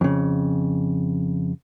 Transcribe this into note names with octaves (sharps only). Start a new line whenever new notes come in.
F2 C#3